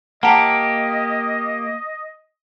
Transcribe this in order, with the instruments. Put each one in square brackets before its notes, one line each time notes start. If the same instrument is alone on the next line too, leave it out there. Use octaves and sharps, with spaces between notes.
[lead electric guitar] A#3 G4 [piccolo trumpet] D#5 [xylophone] F#5 A5 A#5